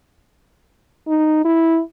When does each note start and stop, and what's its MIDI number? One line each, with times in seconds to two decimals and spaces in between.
1.08 1.42 63
1.45 1.80 64